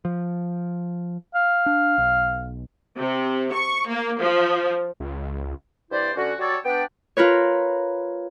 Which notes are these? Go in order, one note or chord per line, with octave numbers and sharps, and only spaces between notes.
F3
F5
D4
B1
C3
C#6
A#3
F3
C#2
G2 C3 E4 C5 D5
D2 D3 C#4 F#4
F#3 G3 F#4 A4 C#5 D5
B3 D4 G5
F4 A#4 B4 C#5